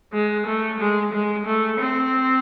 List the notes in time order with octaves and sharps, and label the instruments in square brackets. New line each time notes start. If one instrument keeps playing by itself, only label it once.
[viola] G#3
A3
G#3
G#3
A3
C4